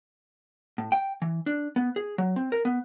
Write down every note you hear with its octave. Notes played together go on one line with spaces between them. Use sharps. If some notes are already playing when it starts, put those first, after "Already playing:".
A2
G5
E3
D4
B3
G#4
F#3
C4
A#4
B3